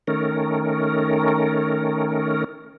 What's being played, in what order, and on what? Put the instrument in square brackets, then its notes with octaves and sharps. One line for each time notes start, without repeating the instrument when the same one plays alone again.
[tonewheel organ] D#3 A3 C#4 A#4